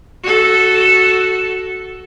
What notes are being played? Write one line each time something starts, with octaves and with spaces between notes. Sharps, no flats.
F#4 A4